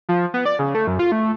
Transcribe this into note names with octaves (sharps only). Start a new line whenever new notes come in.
F3
B3
D5
C#3
A3
F#2
F4
A3